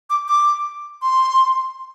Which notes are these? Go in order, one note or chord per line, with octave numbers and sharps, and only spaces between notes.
D6
D6
C6